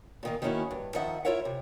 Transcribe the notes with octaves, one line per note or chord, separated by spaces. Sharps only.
A#2 D#3 A#3
D#3 A#3 B3 C#4 E4 F#4
G2
D#3 F3 D#5 E5 F#5
E4 F4 A#4 C#5 E5 F#5
C3